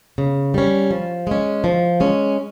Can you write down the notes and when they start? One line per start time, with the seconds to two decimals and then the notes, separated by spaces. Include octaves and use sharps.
0.18 C#3
0.54 G3 C#4
0.91 F3
1.27 G#3 C#4
1.64 F3
2.00 G#3 C#4